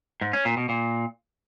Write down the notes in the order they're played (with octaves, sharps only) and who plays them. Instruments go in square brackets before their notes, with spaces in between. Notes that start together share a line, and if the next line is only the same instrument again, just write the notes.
[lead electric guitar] G#2
C#4
A#2
B2
A#2